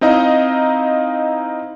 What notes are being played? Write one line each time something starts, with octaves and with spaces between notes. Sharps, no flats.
C4 D#4 E4 D#5 F5 A#5